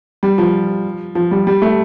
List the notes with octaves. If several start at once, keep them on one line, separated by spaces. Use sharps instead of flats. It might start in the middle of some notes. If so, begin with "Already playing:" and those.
G3
F3
F3
G3
G3
A3